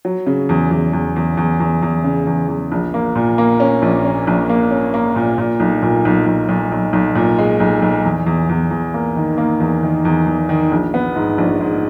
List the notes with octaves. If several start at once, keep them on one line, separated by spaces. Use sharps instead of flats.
F#3
C#3
E2
E2
E2
E2
E2
E2
E2
C#3
E2
E2
A#1
A#3
A#2
A#3
C#4
A#1
C#4
A#1
A#3
C#4
A#3
A#2
A#2
B1
A#2
B1
B1
B1
B1
B1
A#2
G#3
B1
B1
E2
E2
E2
E2
A#3
D#3
A#3
E2
D#3
E2
E2
D#3
A#1
B3
G#2
A#1
G#2